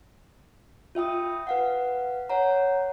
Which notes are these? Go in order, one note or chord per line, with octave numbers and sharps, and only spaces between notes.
F4 E5 G5 D#6
B4 F5 F#5
C#5 F#5 A#5